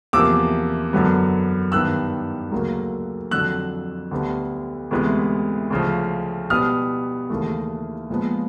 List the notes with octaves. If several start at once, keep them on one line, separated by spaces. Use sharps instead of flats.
E2 C3 F3 A#3 D6 E6
F#2 D3 F#3 B3
G2 D#3 G3 B3 E6 F#6
D2 C#3 F#3 A#3
F2 D3 F#3 E6 F#6
D2 D3 G3 B3
D2 C3 E3 G#3 B3
D2 C#3 F3
B2 G3 B3 D#6 F6
D#2 C#3 E3 A3
A#2 F3 G#3 B3